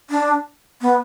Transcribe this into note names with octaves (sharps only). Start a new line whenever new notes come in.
D4
B3